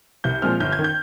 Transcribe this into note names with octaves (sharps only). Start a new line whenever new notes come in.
C2 G6
A#2 F3 G#3 C4 F6
G1 G6
G#6
D#3
G6